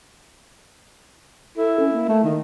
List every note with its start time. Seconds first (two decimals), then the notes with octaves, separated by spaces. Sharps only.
1.57 E4 A4
1.80 C#4
1.93 A#3
2.09 A3
2.24 D#3